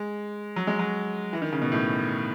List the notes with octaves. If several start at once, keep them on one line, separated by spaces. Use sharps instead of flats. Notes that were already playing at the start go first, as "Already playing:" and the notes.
Already playing: G#3
F#3
G#3
F#3
E3
D#3
C#3
B2
A2